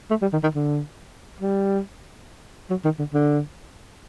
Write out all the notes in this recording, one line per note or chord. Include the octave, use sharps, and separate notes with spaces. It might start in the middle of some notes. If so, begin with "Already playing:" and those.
A3
G3
D#3
D#3
D3
G3
F#3
D#3
D3
D3